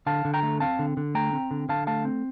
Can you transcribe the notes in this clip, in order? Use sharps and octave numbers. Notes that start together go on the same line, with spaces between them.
D3 F5 A5
D3
G5 A#5
A3
C4 F5 A5
D3
D3
A3 G5 A#5
C4
D3
D3 F5 A5
A3 F5 A5
C4